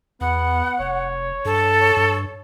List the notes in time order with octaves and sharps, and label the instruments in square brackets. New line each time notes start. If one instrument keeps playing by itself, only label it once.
[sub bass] E2 [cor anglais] B3 [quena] F#5
[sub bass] F1 [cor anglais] C#5
[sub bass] G2 [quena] A4
[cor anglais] C#5
[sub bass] G2